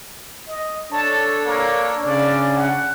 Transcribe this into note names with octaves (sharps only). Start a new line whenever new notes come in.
D#5
D4 A4 C#5 A5
A#3
C#3 C#4 D4 D5
F#5